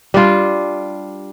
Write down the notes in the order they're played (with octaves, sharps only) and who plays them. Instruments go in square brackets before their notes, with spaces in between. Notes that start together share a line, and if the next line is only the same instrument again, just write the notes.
[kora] G3 D4 F4